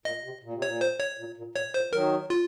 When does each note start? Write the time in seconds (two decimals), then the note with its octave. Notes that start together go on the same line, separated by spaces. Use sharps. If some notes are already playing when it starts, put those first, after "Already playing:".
0.05 A#2 D#5
0.24 C3
0.43 A#2
0.54 C3
0.62 A#2 C#5
0.81 C5
1.00 C#5
1.19 A#2
1.37 A#2
1.56 A#2 C#5
1.74 A#2 C5
1.93 D#3 F#3 A#4
2.30 F4